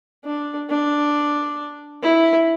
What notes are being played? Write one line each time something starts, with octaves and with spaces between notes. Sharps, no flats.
D4
D4
E4